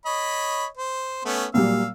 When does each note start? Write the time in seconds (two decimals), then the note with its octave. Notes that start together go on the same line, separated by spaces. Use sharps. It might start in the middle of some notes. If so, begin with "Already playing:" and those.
0.05 C#5 D#5 B5
0.77 C5
1.25 A3 B3 C#4
1.54 A#2 F#3 G3 F5 E6